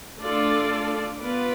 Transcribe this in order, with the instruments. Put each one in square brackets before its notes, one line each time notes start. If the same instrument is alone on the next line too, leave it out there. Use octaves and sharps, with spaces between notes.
[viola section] A3 D4 F4 A4 D5
B3 F4 B4 D5